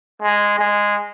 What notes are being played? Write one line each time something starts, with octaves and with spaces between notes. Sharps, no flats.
G#3
G#3